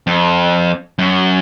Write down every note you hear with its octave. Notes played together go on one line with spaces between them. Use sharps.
F2
F#2